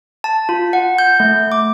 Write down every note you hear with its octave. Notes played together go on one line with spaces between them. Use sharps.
A5
F4
F#5
G6
A3
D6